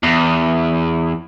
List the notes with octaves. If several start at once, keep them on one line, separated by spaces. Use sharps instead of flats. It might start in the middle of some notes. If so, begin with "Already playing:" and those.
E2